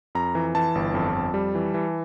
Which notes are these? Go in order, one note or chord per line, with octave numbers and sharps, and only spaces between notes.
F2 A#5
E3
E3 A5
G1
F2
F2
G3
E3
E3